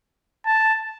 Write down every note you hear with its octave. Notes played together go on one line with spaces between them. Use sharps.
A5